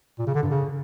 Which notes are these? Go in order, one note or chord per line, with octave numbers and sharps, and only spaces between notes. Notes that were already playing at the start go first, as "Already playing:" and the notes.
A#2
C#3
D3
G2
C#3